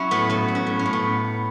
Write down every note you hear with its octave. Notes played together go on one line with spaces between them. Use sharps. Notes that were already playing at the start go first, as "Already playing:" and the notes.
Already playing: F#3 C#4 E4
A2 B3
F#3 B3
F#3
C#4
A2
C#4
A2
B3